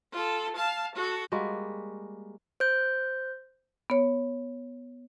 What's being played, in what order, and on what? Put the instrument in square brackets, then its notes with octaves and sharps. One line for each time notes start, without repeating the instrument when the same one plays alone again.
[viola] F4 A4
F5 A5
F#4 A4
[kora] G3 G#3 A#3 F#4
[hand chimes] C5 G6
[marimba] B3 C#5